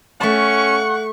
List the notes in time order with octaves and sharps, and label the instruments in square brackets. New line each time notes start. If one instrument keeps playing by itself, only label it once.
[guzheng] A3 A5 [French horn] C#4 [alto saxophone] F#5 [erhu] C#6